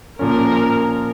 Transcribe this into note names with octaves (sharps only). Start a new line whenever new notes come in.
A#2 F3 C#4 A#4